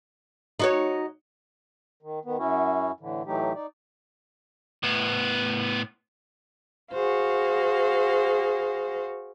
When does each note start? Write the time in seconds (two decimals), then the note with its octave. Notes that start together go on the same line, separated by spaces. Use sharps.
0.60 D#4 F#4 C#5
2.02 D#3
2.25 D#3 B3
2.38 F#2 C#4 E4 F#4
3.00 A2 D3 E3
3.26 A2 E3 F#3 A3 D#4 G4
3.55 D#4 D5
4.83 A2 B3
6.93 F#4 G#4 C5 F5